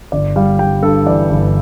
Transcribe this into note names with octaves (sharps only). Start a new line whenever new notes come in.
G1 D5
G3 F5
G3 G5
G2 A4
E3 D5
G1